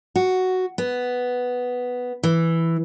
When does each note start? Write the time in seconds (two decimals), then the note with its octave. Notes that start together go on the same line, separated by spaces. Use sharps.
0.16 F#4
0.78 B3
2.23 E3